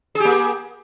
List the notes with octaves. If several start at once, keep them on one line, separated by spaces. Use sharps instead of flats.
A#3 G4 G#4